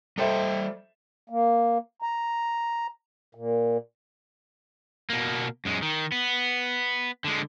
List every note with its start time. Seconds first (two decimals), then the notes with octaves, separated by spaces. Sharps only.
0.18 G3 A4 C5 D#5 E5 G5
1.30 A#3
2.02 A#5
3.35 A#2
5.10 B2 A#3
5.65 F#2 G#3
5.82 D#3
6.12 B3
7.24 D3 G#3